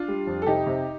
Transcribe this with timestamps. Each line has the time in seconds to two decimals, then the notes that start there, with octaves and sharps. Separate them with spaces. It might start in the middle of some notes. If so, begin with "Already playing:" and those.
Already playing: D4 F4
0.08 G3
0.27 F2
0.42 A4
0.46 C3 D#4 G4
0.66 C3